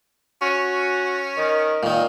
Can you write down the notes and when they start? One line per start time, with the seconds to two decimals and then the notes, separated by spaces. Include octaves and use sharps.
0.41 C#4 F#4
1.38 D#3
1.83 A#2 D#3